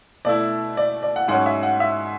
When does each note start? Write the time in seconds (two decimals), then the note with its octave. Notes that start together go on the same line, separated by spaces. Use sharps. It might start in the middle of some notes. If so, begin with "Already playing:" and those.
0.25 B2 A3 E4 D5
0.77 D5
1.03 D5
1.16 F#5
1.28 G#2 F#3 C#4 F#5
1.46 E5
1.63 F#5
1.80 E5